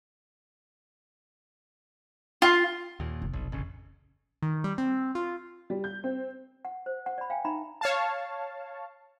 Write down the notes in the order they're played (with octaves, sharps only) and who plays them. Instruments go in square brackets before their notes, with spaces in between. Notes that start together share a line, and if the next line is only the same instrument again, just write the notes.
[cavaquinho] F4
[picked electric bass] D#2 A#2
[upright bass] F1
[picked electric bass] B1
A1 C#3
[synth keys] D#3
G3
C4
F4
[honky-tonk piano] G3
G6
C4
[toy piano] F#5
C5
F#5
D5 B5
F5 G5 G#5
D#4 E5 A#5 B5
[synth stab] C#5 F5 A5